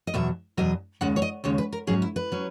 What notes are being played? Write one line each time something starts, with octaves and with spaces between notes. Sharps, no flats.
D#5
E2 B2 F#3 E5
E2 B2 F#3 D#5
D#2 C#3 G#3 F#5
C#5
D#5
D#2 C#3 G#3 C#5
B4
A#4
G#2 F#3 C#4 G#4
E4
B4
F#3 C#4